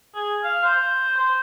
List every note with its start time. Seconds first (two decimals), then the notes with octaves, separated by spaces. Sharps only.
0.15 G#4
0.44 F5
0.64 C5
1.16 C5